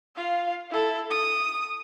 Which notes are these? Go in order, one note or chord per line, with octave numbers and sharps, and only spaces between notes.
F4 F5
E4 A4
D#6